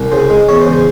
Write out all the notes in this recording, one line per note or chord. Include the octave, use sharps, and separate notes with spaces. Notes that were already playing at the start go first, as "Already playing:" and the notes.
Already playing: C2
C#3 C5
G#3
E2 C#5
C5
C#3
C5